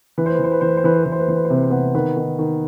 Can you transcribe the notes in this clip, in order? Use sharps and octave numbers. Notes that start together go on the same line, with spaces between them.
E3 B4
C5
B4
E3 C5
B4
E3 C5
B4
C5
E3 B4
C5
E3 B4
C5
B4
E3 C5
B4
C5
C3 B4
C5
C3 B3 B4
D#3 B3 B4
D#3
D#3